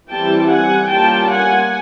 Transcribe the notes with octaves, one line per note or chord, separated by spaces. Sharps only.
E3 G3 C4 E4 G5 A5
F#5 G#5
G3 A#3 C#4 F4 G5 A5
F#5 G#5